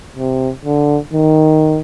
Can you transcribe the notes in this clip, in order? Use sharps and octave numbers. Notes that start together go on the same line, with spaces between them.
C3
D3
D#3